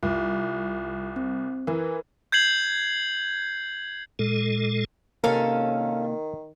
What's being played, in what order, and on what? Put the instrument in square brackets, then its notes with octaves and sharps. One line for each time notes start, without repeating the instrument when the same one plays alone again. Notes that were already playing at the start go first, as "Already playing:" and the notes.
[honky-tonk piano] C2 [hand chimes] F4
[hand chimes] C4
[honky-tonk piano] E3 [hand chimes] A#4 B4
[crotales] G6 G#6 C7 F#7
[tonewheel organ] A#2 G#3 A4
[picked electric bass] C3 A#3 [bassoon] D#3 [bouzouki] C#4 A4 F5 [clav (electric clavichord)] A#4